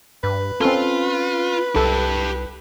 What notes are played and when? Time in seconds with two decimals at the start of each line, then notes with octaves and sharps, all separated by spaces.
0.24 G2 B4
0.61 C4 C#4 F4 A4
1.76 C2 G4 A4 A5